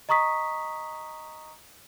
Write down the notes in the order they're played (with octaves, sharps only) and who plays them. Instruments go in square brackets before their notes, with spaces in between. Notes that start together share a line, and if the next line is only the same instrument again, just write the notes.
[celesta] D#5 A#5 C#6 D#6 B6